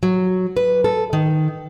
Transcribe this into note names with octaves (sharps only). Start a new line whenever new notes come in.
F#3
B4
A4
D#3